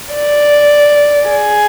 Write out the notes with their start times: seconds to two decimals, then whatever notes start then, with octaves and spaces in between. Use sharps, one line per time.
0.14 D5
1.28 G#4